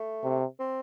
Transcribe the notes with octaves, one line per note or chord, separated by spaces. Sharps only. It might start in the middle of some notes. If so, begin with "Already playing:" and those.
Already playing: A3
C3
C4